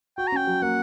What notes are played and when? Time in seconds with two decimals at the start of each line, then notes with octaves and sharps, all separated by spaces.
0.18 F#4 G5
0.27 A#5
0.32 C#4 G5
0.47 F#3
0.62 A#3 F#5